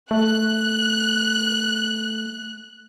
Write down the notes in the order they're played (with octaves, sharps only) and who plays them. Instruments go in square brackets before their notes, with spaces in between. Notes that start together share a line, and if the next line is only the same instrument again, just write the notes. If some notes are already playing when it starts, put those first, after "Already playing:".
[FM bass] A3 [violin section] F#6